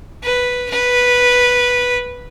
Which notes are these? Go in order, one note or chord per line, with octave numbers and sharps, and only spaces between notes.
B4
B4